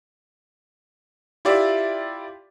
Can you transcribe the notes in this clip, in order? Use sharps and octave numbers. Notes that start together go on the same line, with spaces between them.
E4 F4 G4 D5 E5